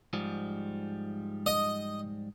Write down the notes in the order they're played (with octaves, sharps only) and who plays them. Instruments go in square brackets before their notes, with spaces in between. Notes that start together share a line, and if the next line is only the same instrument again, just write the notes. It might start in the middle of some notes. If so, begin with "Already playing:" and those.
[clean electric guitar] G#2 F3 G3
[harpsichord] D#5